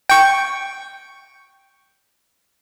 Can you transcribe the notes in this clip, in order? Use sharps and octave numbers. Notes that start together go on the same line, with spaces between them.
G5 C#6